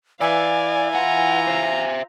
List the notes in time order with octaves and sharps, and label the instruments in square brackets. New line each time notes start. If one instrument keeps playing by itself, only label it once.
[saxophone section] E3 [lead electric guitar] D5 [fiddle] F5 [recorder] G#5
[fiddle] F4 A#5 [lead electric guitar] F#5
[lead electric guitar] C5 E5